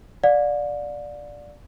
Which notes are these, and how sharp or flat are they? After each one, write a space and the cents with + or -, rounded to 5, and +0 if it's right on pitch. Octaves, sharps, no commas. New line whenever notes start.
D5 +0 F5 +45